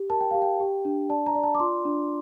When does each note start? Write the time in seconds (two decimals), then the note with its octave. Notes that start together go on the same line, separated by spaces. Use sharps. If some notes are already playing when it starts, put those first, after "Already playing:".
Already playing: G4
0.10 A#4 A5
0.21 G5
0.31 G4 F5
0.42 G5
0.60 G4
0.85 D4
1.09 D5 A5
1.26 A#5
1.35 D5
1.44 A5
1.55 D6
1.60 F4 C6
1.85 D4